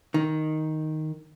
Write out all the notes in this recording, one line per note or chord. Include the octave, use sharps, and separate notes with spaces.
D#3